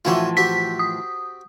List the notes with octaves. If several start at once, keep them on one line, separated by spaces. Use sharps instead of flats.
A2 E3 F3 F4 F#4 C#5
C4 F#4 G4 B6
D#6